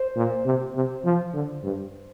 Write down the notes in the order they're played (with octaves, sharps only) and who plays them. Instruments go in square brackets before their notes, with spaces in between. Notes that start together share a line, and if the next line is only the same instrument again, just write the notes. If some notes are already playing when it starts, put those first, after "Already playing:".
Already playing: [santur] C5
[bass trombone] A#2
C3
C3
F3
D3
G2